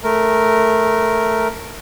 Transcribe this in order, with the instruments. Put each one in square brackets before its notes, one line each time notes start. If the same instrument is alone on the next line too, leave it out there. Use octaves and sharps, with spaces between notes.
[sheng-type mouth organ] A3 A#4